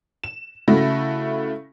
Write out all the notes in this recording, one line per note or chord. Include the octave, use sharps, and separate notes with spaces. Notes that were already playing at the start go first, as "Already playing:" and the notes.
E7
C#3 A3 E4 F#4 A#6